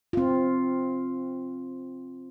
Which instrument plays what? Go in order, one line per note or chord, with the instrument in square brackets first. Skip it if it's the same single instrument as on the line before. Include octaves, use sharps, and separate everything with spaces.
[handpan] C4 F4